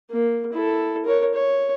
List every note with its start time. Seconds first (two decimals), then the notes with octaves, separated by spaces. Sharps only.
0.11 A#3
0.53 E4 A4
1.05 A#4 C#5
1.34 C#5